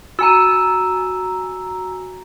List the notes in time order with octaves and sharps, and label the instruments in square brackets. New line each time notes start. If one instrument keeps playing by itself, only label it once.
[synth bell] F#4 G#5 A#5 [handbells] E6